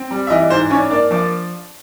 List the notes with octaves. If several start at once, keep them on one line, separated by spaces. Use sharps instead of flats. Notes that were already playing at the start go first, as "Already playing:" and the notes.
Already playing: C4
G3
E5
E3 D#4 D#5
G#2 C5
C#4 D4 C#5
A#3 D4 D5
F3 D4 D5